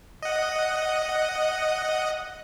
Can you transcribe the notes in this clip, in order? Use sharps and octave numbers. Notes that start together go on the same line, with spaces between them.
D#5 F#5